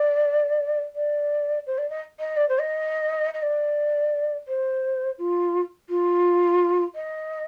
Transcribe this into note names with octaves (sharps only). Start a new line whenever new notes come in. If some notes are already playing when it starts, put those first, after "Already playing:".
Already playing: D5
D5
C5
D5
D#5
D#5
D5
C5
D#5
D#5
D5
C5
F4
F4
D#5